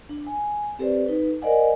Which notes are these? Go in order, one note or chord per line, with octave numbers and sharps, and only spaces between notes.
D4
G#5
C4 G4 A4 B4 C5 D5
D#4 A4 B4
A#4 C5 D5 D#5 F#5 G#5